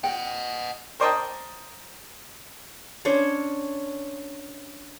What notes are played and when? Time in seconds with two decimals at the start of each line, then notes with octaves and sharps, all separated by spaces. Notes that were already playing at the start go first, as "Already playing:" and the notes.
0.04 D#5 F#5 G5
1.00 A#4 C5 D5 D#5 G5 A5
3.05 C#4 D4 C5 C#5